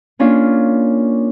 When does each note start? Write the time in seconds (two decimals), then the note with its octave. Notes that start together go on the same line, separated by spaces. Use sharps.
0.19 A#3 C#4 D4 F4